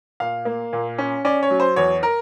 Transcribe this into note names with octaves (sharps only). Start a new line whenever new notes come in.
A#2 F5
A#3
A#2
C#4
C#4 D5
C#5
F#3
C5
E2 C#5
A#4